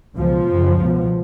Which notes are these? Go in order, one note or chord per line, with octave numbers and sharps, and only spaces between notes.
C#2 B2 F3
F#2 C#3
C#2 B2